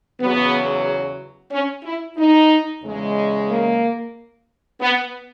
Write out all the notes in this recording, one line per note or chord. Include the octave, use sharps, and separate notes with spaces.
E2 C#3 F#3 B3
C#4
E4
D#4
E2 C#3 G#3
A#3
B3